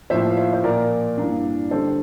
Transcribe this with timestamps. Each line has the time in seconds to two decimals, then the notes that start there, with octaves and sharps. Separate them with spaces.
0.10 A2 F3 A#3 C5 E5
0.30 F5
0.37 C5 E5
0.53 C5
0.64 A#2 F3 A#3 A#4 D5
1.17 G2 E3 A#3 D4
1.71 D3 G3 D4 A4 C5